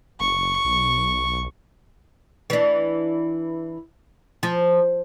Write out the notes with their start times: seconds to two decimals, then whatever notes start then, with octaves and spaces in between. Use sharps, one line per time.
0.20 F#1 C#6
0.65 B1
2.50 E3 D4
4.43 F3